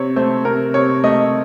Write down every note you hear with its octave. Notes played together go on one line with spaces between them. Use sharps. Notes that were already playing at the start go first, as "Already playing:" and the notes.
Already playing: C3 C#5
A3 C5
C3 A#4
C3 C#5
A3 D#5